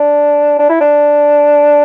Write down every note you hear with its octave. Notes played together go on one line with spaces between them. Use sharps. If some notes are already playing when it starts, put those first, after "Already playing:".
Already playing: D4
D4
E4
D4